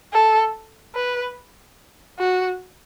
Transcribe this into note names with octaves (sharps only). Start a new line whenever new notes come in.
A4
B4
F#4